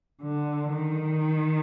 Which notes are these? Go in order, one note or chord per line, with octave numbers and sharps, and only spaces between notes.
D3
D#3